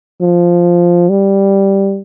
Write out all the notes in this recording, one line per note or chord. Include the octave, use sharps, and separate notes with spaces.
F3
G3